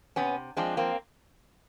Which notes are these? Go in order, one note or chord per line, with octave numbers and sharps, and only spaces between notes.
C3 B3 C#4
F3 G#3 C4 D4
A#3 C4